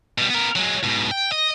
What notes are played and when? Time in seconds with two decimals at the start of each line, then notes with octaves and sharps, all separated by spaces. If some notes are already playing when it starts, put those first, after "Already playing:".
0.18 B2 G3
0.30 B3 A#4
0.56 F#3 G#3
0.83 G#2 B2
1.11 G5
1.32 D#5